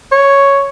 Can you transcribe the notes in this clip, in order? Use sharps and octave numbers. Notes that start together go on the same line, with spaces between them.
C#5